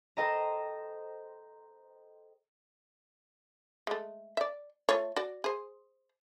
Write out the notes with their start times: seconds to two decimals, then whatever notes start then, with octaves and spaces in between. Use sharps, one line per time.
0.17 A4 C5 D#5 G5 A5 A#5
3.87 G#3 A3
4.37 D5 E5
4.89 A3 F4 C#5
5.16 F#4 D5
5.44 G#4 C5